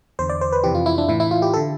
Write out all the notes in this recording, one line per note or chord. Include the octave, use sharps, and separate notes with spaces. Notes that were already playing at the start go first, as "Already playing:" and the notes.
E2 D3 C5
D5
C5
B4
F2 C3 E3 G4
F4
E4
D4
A2 E3 E4
E4
F4
G4
A4
D3